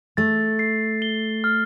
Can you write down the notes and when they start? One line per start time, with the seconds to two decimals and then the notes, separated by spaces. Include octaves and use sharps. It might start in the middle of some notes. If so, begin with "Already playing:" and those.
0.17 A3 A6
0.59 C7
1.02 G7
1.44 F6